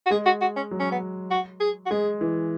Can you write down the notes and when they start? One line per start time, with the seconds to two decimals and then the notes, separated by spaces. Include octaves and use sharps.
0.06 F#4
0.11 G#3 G#4
0.26 F#4
0.41 F#4
0.56 C#4
0.71 F#3
0.79 C#4
0.91 B3
1.30 F#4
1.60 G#4
1.86 F#4
1.90 G#3 G#4
2.21 E3